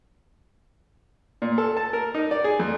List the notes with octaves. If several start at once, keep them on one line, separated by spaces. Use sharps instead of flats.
A#2
A4
A5
A#4
D#4
D5
G#4
F2